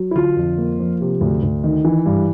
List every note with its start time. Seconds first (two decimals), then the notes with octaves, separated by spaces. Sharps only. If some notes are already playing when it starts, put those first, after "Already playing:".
Already playing: F#3
0.11 E4
0.16 D3 F4
0.36 F2
0.58 A#3
0.79 F3
1.01 C3
1.21 D2
1.43 D2
1.64 D#3
1.85 E3
2.06 G2